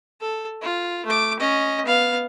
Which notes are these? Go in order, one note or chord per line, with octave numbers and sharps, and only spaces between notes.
A4
F4
A3 D6
C#4 D#5
B3 F5